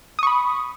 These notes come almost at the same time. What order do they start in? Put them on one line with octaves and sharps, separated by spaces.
D#6 C#6 B5